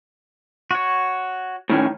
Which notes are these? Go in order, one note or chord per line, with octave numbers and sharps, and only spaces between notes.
F#4 C#5
A2 D#3 C#4